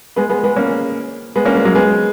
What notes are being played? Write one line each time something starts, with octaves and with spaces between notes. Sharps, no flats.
G#3 B3
G#3 B3
G#3 B3
A#3 C#4
G#3 B3
A#3 C#4
G#3 B3
F#3 A#3
G#3 B3